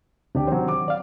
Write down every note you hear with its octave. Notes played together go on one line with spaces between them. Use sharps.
D2 C3 D4 G4 G5
D#3 F#3 C4 C5
D6
D5 F5